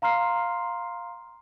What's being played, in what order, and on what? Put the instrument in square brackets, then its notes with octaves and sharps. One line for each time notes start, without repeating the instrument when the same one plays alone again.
[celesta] F5 A#5 C6 F6 C7